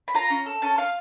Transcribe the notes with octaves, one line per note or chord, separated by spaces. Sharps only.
B5
F4 A#5
C#4
A4
C#4 A5
F4 F5